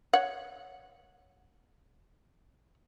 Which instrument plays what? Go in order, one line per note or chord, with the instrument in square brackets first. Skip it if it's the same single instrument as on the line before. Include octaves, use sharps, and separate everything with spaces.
[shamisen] C#5 F#5